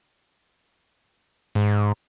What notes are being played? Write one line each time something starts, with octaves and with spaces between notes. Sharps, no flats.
G#2